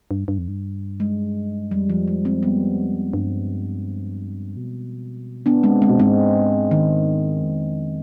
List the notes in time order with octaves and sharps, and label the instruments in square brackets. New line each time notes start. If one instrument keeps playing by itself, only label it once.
[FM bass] G2
G2
F2
G2
[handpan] G#3
[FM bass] F2 [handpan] G3
[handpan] F3
G#3
G#3 C4
G3 B3
[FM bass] G2
B2
[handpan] B3 D4
G#3 C4
G#3 C4
[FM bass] B2
[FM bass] G#2 [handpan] G#3 C4
[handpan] D#3
[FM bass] F2